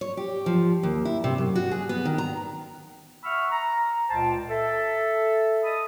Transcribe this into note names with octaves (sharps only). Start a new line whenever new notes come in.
C#5
G4
F3
D#2
E4
C3
F#2
F#4
G#4
B3
D#3
A#5
E5 F#5 B5 C#6 E6 F6
A#5
C#2 A#2 C5 G5 A5
A4 E5
D#5 A5 B5 D#6